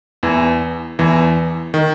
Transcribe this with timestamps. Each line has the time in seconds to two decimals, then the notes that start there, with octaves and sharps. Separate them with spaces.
0.23 E2 E3
0.99 E2 E3
1.74 D#3